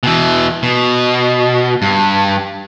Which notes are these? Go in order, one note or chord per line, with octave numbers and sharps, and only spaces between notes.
B2 E3
B2
G2